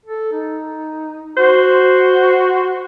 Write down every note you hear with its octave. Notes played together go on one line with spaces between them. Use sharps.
A4
D#4
F#4 C5